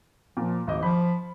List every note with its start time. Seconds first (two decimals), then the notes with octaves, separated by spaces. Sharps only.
0.37 A#2 F3
0.67 G#1 D2 D#5 D6
0.83 F3 B5